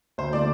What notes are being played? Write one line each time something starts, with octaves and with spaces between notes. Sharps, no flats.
D2 C5
D3 A3 E4 D5